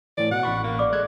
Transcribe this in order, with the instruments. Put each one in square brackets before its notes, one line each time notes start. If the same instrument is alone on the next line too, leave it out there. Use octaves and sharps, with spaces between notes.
[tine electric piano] A2 E3 [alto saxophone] D5
[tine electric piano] B2 [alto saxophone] F#5
[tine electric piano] A1 B5 C#6
[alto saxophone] A#3
[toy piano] D5 D6
[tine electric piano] G#3 F#6 G#6 [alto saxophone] A4